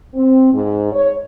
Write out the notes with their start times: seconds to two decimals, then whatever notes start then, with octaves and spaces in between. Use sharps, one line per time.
0.14 C4
0.53 G#2
0.92 C#5